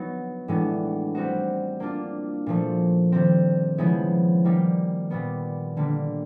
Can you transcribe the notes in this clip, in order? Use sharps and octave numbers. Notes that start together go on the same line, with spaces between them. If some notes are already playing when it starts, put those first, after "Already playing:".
Already playing: F#3 B3 D#4
A2 E3 G#3 B3 D4
G3 C4 D#4 F#4
A#3 D4 F4
A#2 F3 A3
D#3 G3 C4
C#3 F3 G#3 B3 E4
D#3 G3 A#3 D#4
A#2 G3 B3
D3 G3 A#3